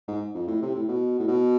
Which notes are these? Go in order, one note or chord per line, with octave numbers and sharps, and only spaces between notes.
G#2
F2
A2
C3
A2
B2
A2
B2